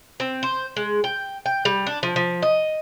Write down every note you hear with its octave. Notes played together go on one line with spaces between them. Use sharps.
C4
C5
G#3
G5
G5
G3
D4
F3
F3
D#5